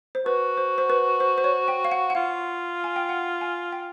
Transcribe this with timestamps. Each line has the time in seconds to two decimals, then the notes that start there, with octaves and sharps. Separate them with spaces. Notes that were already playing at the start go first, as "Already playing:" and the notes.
0.15 C5
0.26 F#4 B4
0.57 C5
0.78 C5
0.90 B4
1.20 C5
1.38 C5
1.44 C#5
1.68 G5
1.85 F5
1.92 F#5
2.10 F#5
2.15 F4 F5
2.84 G#5
2.96 G5
3.09 F#5
3.41 G#5
3.72 G5